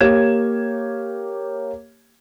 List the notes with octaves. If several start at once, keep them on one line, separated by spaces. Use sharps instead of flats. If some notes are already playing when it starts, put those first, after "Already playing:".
A#3 G4 C#5 G#6 E7